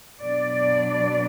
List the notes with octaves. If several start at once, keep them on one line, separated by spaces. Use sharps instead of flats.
B2 F#3 B3 D4 D5